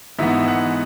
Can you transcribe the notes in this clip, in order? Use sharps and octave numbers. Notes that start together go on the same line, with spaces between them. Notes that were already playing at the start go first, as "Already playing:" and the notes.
G#2 E3 B3 E5
F#5